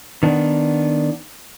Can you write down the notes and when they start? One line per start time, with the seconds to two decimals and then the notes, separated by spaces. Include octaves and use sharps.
0.23 D#3 B3 D4